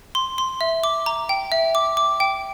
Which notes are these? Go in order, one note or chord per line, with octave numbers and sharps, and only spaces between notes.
C6
C6
E5
D6
A#5
G5
E5
D6
D6
G5